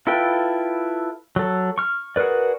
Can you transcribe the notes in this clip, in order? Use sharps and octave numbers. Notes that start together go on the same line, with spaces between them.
E4 F4 A4 B4 G5
F#3 A4
C#6 F6
F#4 G#4 A#4 B4 D5